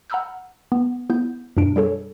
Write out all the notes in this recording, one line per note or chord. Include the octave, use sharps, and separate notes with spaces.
F#5 A#5 B5 E6 F6 G6
B3
B3 E4 G6
F#2 B2 D4 D7
G3 G#4 A4 C#5